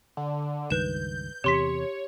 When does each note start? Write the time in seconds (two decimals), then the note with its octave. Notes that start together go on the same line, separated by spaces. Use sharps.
0.17 D3
0.70 C#2 G2 D#3 B4 G6 E7
1.44 E2 C3 G4 C#5 C6 B6